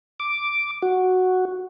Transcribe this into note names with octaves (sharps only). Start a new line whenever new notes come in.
D6
F#4